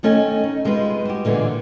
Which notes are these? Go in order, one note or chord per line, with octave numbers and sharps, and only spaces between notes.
D#3 A3 C#4 A4 D#5 G#5
D#4
G3 G#3 D#4 F4 B4
F#4 G4
A#2 D3 E3 G#3 B3